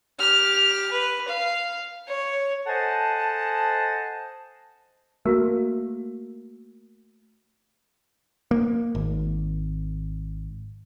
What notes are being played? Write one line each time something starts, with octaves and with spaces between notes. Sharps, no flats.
G4 F6
B4
F5
C#5
A4 C5 D#5 F#5 G#5 A5
A3 A#3 F#4 A#4
A#3
G#1